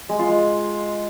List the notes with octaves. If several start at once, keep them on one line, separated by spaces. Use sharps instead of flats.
G#3
F4
G#3